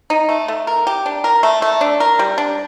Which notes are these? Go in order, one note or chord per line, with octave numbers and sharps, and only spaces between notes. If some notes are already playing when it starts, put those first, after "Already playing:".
D#4
A3
A3
A#4
G4
D4
A#4
A3
A3
D4
A#4
G3
D4